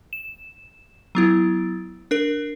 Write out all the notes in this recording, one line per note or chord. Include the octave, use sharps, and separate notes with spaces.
E7
F#3 B3 E4
D4 A#4